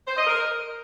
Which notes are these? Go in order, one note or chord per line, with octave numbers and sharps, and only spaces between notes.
C5
D#5
A#4